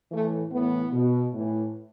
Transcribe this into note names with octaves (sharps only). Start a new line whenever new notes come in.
A2 E3 A3
A2 E3 B3
B2
A2 E3